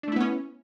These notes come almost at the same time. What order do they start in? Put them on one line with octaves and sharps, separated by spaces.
D4 A3 E4 B3 C#4